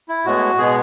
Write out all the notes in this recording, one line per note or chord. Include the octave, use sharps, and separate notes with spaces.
E4
A2 G#3 B3 F#4
B2 G#3 B3 G#4